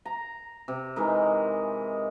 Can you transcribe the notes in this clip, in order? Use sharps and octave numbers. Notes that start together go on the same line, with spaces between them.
A#5
C3
E3 G#3 D#4 A#4